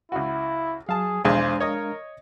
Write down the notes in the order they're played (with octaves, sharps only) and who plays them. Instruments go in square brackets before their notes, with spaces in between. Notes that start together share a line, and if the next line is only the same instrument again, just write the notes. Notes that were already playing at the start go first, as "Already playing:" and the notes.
[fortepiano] C#2 F#4 [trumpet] E4
[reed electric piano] F#3 [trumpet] G#4 [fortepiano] F5 A5
[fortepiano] B1 E2 G#4 [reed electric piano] G#3 D4 F5 [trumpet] C5
[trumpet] A#4 [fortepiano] C#5 D#5 D#6